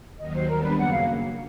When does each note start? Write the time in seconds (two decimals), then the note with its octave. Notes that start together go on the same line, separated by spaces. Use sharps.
0.19 D#2 D#3 F#3 D#5
0.34 C5
0.49 G3 B3 D4 A#4
0.63 B4
0.78 F#2 C#3 F#3 A#3 F#5
0.91 F5